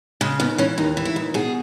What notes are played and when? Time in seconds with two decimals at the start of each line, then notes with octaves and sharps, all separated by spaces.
0.21 C#3 G#3
0.40 D#2 B3
0.58 E3 C#4
0.78 D#2 D#4
0.97 E3
1.05 E4
1.16 D#2
1.34 B2 G#4